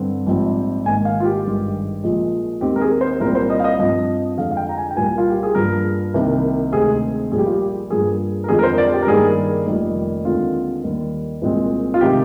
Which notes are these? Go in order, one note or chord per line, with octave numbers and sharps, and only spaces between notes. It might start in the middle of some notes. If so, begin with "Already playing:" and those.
Already playing: G2 D3 C4
A#1 G#2 G3 C4
G#1 G#2 D#3 A#3 G#5
F5
F4
G4
G#1 G2 D#3 G#3
A#1 A#2 F3 G#3
D#2 D#3 G#3 C4 G4
A#4
G#4
C5
C2 A#2 G3 C4 A#4
C5
D#5
F5
D#5
G2 F3 C4 D#5
F2 D3 G#3 F5
F5
G5
A#5
G#5
G5
C2 A#2 G3 A#3 G#5
F4
G4
G#4
G2 F3 A#3 A#4
C2 C3 D#3 A#3
D2 C3 D#3 G#3 C4 G#4
A#1 A#2 G3 G#4
G4
F4
G4
G2 F3 A#3 G#4
A#4
F2 D3 F3 G#3 C4 G#4
A#4
C5
D5
G4
A#4
G2 D#3 G3 A#3 G#4
F1 F2 D#3 G3 A#3
D#2 D3 G#3 C4 F4
D#2 D#3 G3 A#3
C2 A#2 G#3 C4
F4
C3 D#3 G#3 G4